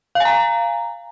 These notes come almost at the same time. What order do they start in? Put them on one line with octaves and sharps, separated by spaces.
F5 G#5 A#5